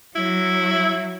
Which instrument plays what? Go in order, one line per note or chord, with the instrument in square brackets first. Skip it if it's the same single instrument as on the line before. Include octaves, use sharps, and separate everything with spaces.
[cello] F#3 [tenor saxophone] E4